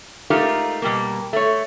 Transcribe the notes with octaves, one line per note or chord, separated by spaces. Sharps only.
G#3 A3 D#4 F4 G4 A#4
B2 G3 A#3
A3 C#5